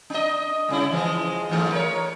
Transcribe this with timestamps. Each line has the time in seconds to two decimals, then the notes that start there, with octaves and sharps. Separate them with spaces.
0.10 D4 D#5
0.68 G2 C#3 E4
0.91 E3 F3 G#3
1.49 G#2 E3 A3
1.72 A#4 C#5